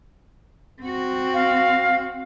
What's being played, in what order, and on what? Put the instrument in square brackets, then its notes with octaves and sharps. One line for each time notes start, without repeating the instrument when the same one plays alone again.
[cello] C4 F#4
[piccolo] F5